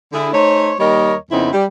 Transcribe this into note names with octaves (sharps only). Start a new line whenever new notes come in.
D3 E4 G#4
A3 D#4 C5 C#5
D#2 G3 A#4 C#5 D#5
F2 C#3 B3 C4 D#4 E4
G3